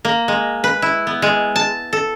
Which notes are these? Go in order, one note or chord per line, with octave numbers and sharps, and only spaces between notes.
A#3
G#3
B4
E4
B3
G#3
A5
A4